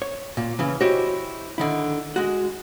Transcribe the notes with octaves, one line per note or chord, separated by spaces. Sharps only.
C#5
A#2
C#3 E3 C#4
E4 F#4 G4 C5 C#5 D#5
D3 D#3 E4
G#3 F#4